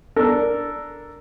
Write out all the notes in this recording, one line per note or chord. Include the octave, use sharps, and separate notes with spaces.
D4 A4 A#4